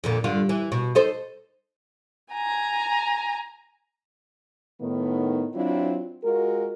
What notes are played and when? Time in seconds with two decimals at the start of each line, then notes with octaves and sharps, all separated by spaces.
0.04 F2 A#2 D3
0.24 G2 D3 F4
0.49 E3
0.72 B2
0.95 D#4 A4 C5
2.33 G#5 A#5
4.81 A2 D#3 B3
5.55 F#3 C4 D4 E4 F4
6.24 G#3 F4 F#4 A#4